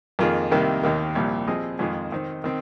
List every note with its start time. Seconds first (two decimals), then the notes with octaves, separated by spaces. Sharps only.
0.19 F2 D#3 A#3 F4 G#4
0.51 C2 C3 D#3 A#3
0.83 D#2 D#3 A#3
1.15 C2 A#2 F3
1.47 F3 C4 G#4 D#5
1.79 F2 D#3 G#3 F4 G#4
2.12 D#3 C4 D#4 C5
2.44 D#3 C4